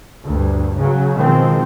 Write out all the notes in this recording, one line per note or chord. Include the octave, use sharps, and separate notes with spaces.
D2 G2
C#3 F#3
B2 D#3 F3 G#3 C4